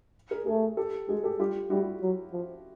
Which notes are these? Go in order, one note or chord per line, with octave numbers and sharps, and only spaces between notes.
G#4 A#4
A3 G#4 A#4
G4 A4
G#3 F#4 G#4
G4 A4
G3 F4 G4
G3 E4 F#4
F#3
F3